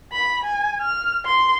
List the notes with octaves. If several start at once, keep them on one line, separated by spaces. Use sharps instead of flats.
B5
G#5
F6
C6